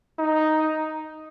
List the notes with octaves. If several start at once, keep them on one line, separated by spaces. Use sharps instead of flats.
D#4